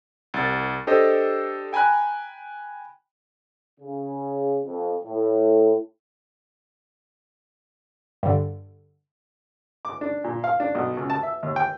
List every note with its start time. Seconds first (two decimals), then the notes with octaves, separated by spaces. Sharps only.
0.34 C2 A6
0.87 D4 G4 A4 C5 D#5
1.73 G5 G#5 A#5 B5 F#6
3.80 C#3
4.64 F2
5.04 A2
8.23 G2 D3
9.85 D6
10.01 D4
10.24 A#2
10.44 F5
10.60 D4
10.75 B1
10.97 C#2
11.10 A5
11.23 E5
11.43 D#2
11.56 G5